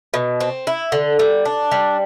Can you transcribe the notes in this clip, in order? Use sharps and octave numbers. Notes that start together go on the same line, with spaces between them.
B2
C4
E4
D3
G3
D4
G3